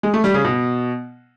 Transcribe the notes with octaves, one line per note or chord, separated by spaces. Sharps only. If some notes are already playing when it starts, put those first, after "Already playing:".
G#3
A3
G3
C#3
B2